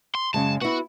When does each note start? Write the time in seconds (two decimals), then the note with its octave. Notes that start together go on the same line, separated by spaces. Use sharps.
0.15 C6
0.34 F#2 C#3 G#3 A5
0.61 B3 E4 F#4